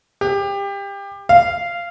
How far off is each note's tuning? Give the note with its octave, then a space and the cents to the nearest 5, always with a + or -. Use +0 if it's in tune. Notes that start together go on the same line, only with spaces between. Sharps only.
G4 +25
F5 -15